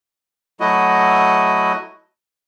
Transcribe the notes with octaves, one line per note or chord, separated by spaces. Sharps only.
F#3 A3 E4 F#4 D#5